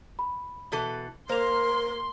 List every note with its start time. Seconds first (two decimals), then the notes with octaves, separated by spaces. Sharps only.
0.19 B5
0.72 B2 E3 A4
1.29 A#3 A#4 C5 C6 F7